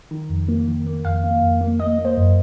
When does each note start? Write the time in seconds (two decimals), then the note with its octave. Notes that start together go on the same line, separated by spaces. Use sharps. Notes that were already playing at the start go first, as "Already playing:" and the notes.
0.11 D#3
0.30 F2
0.49 A#3
0.68 D#3
0.86 A#3
1.05 F2 F5
1.24 A#3
1.43 F2
1.61 A#3
1.80 A#3 D#5
1.99 A#3
2.05 C5
2.17 F#2